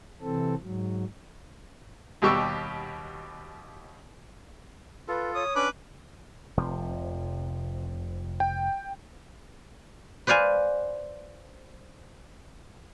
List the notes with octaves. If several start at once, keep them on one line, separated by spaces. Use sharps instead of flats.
C3 E3 C4 A4
G#2 F#3
D#2 B2 G3 G4 C#6 E6
F4 A4 B4
C#5 D#6
C#4 D4 B4 D6
F1 C3 F3
G5
B4 C5 D5 F5 G#5